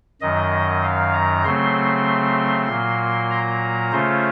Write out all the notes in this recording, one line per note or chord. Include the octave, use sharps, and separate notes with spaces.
F#2 D#3 F#3 D#5
F5
A#5
C#3 F#3 A3 C4 C6
A#2 F#3 A#3
A#5
C#3 A3 C#4 F4 C5